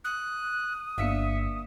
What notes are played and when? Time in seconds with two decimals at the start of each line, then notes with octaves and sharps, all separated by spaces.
0.04 D#6 F#6
0.98 G1 A#3 D4 E5 F5 B6 C#7